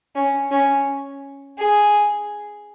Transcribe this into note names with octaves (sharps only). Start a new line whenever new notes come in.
C#4
C#4
G#4